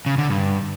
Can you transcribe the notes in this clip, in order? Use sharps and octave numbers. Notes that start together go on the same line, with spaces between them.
C#3
D3
G2